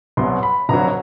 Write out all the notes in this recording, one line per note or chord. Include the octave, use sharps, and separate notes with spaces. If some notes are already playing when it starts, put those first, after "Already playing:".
C2 B2 F#3 C6
B5
F1 F2 D3 F#3 A#5